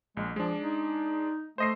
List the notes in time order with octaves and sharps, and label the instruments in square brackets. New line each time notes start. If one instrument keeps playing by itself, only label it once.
[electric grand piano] A#1 [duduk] G#3
[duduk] F3 [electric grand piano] G#3 D4
[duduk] D#4
[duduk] A3 [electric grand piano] C5 D#5 C7